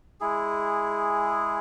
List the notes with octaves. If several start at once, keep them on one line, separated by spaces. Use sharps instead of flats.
G#3 E4 G#4